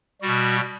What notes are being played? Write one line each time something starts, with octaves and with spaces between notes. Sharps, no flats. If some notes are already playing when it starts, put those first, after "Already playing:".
B2 G3 F#4